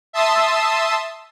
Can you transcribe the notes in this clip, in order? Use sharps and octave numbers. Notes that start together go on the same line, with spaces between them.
E5 A5 C6 D#6 E6